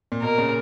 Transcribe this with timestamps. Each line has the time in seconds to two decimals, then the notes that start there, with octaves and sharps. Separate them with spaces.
0.12 A#2
0.22 B2 A#4
0.38 A#2 C#3